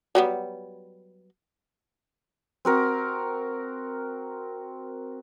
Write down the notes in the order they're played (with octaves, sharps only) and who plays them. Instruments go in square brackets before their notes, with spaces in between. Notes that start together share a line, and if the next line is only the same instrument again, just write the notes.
[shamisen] F#3 G3 B3
[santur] C4 F#4 A#4